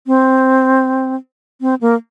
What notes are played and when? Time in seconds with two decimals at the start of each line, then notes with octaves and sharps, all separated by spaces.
0.07 C4
1.61 C4
1.81 A#3